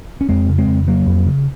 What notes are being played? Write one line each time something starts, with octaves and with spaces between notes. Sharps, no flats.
C#4
F2 G#3 C4
C#3
G#3 C4
F2
C#3 F#3 A#3
F2
C#3